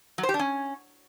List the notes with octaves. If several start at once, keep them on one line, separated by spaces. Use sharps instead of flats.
F#3
C5
G4
D4
C#4